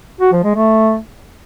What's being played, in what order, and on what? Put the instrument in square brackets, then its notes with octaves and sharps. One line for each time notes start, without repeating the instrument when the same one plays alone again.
[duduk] F#4
F3
G#3
A3